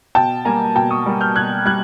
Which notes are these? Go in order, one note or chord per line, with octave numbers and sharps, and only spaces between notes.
B2 G5 A5
G3 A#3 G#5 A#5
B2 G5 A5
C#6 D#6
G3 A#3
F6 G6
B2 F#6 G#6
G3 F#6 G#6